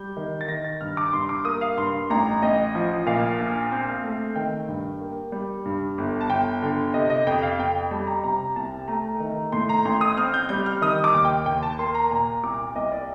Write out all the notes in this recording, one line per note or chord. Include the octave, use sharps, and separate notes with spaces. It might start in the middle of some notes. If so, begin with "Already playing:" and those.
Already playing: G3 G6
D#3
A6
D#3 A#6
A6
G2 F6
D6
G2 C6
D6
A#3 D#6
F5
G2 C6
A1 A#5
A1 D#5
F3
A#2 F5
A#1
C4
A3
D#3 G5
G2
A#3
G3
G2
G1
A5
G1 G5
D3
C3 D#5
D#5
F2 G5
F5
F2 G5
G5
G3 A5
A#5
C3 A#5
C2 A5
A3 A#5
D#3
A2 C6
A#5
A1 C6
D#6
C4 F6
G6
G3 G6
F6
D#3 D#6
D6
D#2
G5
D#2 G5
A5
A#3 C6
A#5
A#2 A#5
C2 D6
C2 D#5
D5